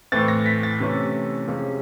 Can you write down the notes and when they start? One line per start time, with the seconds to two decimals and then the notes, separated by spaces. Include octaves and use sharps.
0.12 A2 E3 A3 C4 A6
0.28 A#6
0.46 B6
0.63 A6
0.80 C3 E3 A3 C#4
1.48 C3 F3 G#3 C#4